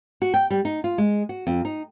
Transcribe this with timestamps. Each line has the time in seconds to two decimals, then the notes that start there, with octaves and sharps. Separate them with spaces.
0.22 F#4
0.34 G5
0.50 G3
0.65 D#4
0.84 F4
0.98 G#3
1.29 F#4
1.47 F2
1.65 D#4